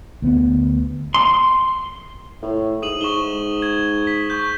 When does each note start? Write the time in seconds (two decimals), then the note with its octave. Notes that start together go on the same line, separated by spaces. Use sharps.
0.22 D2 B3
1.14 C6
2.42 A2
2.82 G#2 D#6 D#7 F#7
3.01 G#2 C#6 E7 G7
3.62 G#6
4.07 B6
4.30 C#6 G6